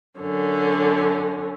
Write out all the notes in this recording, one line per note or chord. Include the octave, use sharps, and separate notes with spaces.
F#2 D3 C#4